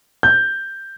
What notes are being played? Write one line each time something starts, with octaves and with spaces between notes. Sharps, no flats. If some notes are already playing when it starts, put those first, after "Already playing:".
G6